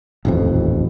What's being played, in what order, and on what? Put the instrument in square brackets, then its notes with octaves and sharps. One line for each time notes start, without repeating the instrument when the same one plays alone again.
[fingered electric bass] D#1 A1 F2